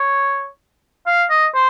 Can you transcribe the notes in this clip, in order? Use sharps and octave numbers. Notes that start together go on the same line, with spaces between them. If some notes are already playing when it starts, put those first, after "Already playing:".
Already playing: C#5
F5
D#5
C5